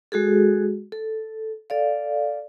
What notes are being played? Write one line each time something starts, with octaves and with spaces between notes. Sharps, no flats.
G#3 F#4 G#4 A4
A4
A4 D5 F5